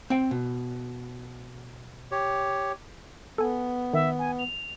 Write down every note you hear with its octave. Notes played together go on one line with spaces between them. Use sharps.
C4 G5
B2
G4 C#5
B3 A4 G#5
D#3 E5
G#5
F7